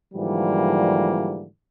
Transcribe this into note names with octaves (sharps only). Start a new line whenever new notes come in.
G#2 D3 E3 F3 G3 A#3